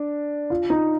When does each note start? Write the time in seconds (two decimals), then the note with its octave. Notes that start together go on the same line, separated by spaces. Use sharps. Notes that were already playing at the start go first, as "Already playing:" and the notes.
Already playing: D4
0.50 F4
0.70 D#4